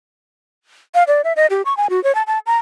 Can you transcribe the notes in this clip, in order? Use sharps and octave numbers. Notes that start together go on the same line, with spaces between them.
F5
D5
E5
D#5
G4
C#6
G#5
F#4
C#5
A5
A5
A#5